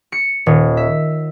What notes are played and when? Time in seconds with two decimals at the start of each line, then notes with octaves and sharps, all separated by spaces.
0.12 C#7
0.46 D#1
0.77 E5